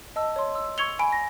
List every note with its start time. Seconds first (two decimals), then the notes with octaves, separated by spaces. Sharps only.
0.16 D#5 A5 E6
0.36 C#5 C6
0.55 E6
0.78 C#6 E6 G#6 C#7 F7 G7
0.99 G#5 B5 D7
1.12 A#6